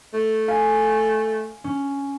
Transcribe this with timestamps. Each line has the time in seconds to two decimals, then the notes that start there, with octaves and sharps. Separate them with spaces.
0.14 A3
0.48 F5 G#5 B6
1.64 C#4